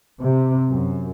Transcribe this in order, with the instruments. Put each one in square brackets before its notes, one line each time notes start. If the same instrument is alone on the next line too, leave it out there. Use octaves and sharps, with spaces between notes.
[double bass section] C3
F#2